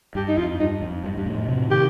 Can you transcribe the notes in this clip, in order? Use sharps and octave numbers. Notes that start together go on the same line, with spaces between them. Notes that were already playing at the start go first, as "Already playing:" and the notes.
G2 G4
D#4
F2 F4
G2 D#4
F2
G2
G2
F2 A2
A2 C3
C3 D#3 G4